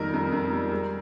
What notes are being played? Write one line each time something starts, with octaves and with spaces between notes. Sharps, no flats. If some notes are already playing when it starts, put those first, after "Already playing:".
Already playing: F2 D#3 G3 A#4
F2
F2
G3
G#3